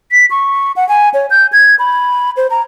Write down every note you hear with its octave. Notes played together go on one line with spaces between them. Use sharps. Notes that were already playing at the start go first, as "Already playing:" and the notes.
B6
C#6
F#5
G#5
C#5
G6
G#6
B5
C5
A#5